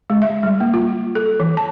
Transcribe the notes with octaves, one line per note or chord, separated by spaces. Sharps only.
G#3
E5
G3
A#3
F4
A4
E3
A5